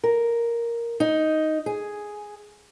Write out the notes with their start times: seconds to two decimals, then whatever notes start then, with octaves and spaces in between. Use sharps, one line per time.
0.04 A#4
1.00 D#4
1.66 G#4